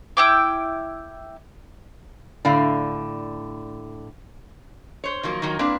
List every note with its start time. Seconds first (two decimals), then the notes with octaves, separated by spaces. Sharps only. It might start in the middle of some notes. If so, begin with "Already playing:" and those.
0.17 E4 G5 D6
2.45 A2 D3 D5 F5
5.04 C5 C#5
5.23 D#3 F3 F#3 A#3
5.42 D#3 F3 F#3 A#3
5.59 A#3 C4 D4 E4 B4